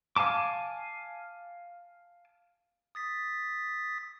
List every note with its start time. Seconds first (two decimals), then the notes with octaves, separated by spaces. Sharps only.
0.16 F5 G#5 A5 D6
2.95 D#6 A6 B6